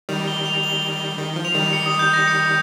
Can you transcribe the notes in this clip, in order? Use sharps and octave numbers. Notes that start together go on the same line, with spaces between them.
D#3 G3 F7
G7
F7
G7
G7
D#3 G7
F3
F7
D#3 G3
C#7
D#6
G6
A#6
C#7